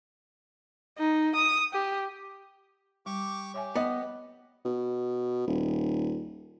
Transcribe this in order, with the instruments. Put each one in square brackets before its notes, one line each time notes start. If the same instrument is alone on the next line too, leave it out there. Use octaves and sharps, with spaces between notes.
[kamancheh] D#4
D#6
G4
[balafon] G3 [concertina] G4 C#6 D6
[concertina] G4 [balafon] C#5 E5 G#5
[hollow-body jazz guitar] B3 [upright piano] D#5
[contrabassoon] B2
D#1